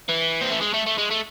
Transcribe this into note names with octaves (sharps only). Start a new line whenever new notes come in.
E3
C4
A3
G#3
A3
A3
G#3
A3